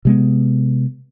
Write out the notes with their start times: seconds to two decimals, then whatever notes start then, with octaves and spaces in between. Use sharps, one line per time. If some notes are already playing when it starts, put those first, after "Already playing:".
0.05 C3 G#3 B3